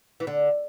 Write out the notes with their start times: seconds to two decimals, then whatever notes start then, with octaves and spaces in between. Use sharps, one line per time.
0.20 E3
0.27 D3